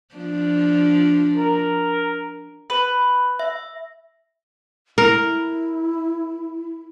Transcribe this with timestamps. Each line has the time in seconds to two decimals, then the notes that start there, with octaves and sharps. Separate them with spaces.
0.15 F3 D4
1.37 A#4
2.70 B4
3.39 E5
4.98 E4 A#4